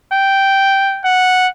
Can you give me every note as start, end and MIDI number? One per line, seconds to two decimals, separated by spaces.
0.12 1.03 79
1.05 1.47 78